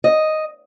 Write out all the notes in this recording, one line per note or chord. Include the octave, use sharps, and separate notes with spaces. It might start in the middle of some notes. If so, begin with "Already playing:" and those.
D#5